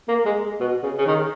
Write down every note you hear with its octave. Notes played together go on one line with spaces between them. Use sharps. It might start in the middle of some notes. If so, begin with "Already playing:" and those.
A#3
G#3
B2
C#3
C#3
D#3